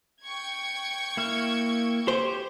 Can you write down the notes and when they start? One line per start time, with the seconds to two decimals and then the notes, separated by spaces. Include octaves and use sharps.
0.24 G5 C#6 G#6
1.17 A#3 E4 F6
2.08 G4 C5